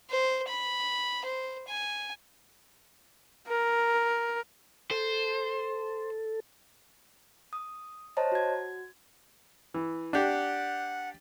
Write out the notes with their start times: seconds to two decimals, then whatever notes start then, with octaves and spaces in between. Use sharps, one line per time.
0.10 C5
0.48 B5
1.25 C5
1.68 G#5
3.48 A#4
4.91 A4 C5
7.53 D#6
8.17 C5 C#5 D#5 A5 A#5
8.32 F#4 G#6
9.74 E3
10.13 D4 G4 F#5